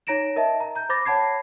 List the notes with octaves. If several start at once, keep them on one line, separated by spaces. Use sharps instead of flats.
D#4 C#5 A#5 A#6 D7 E7
A#4 D#5 E5 A5
A#5
A#5 G6
C5 B5 D6 A6 A#6
C#5 F#5 A5 B5 G#6 C7